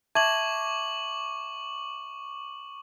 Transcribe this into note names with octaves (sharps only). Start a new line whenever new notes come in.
E5 A5 C#6 D6 G#6 F#7